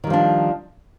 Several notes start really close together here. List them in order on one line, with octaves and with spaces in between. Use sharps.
D#3 G3 F3 D4